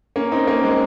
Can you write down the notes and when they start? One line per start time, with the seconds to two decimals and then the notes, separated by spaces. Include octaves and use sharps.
0.16 A#3 C#4
0.32 C4 D#4
0.47 A#3 C#4
0.63 G#3 C4